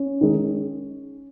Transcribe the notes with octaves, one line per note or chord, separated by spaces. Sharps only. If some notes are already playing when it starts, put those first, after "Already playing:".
Already playing: C#4
D#3 G#3